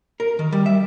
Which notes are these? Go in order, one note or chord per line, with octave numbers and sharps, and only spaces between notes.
A#4
D#3
G3
E5